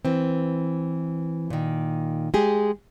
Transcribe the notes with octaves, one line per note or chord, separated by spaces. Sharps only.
E3 C4
A#2 D#3
G#3 G4 G#4